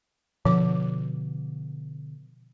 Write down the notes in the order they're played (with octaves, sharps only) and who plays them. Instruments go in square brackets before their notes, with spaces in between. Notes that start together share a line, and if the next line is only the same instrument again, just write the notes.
[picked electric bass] B2 D3 [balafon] F3 D6